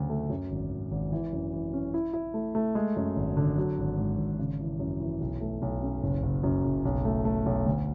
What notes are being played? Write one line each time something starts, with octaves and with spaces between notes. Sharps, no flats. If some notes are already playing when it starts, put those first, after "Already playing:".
Already playing: D2 C#3 F#3
A3
F#2
G#1
G#1
G#1
E3
F#2
E3
C#4
E4
E4
A3
A3
G#3
F#2
G#1
D3
F#3
G#1
G#2
G#1
C#3
E3
F#2
E3
B1
A3
B1
C#4
F#1
F#1
F#2
F#1
B1
A3
A3
B1
D2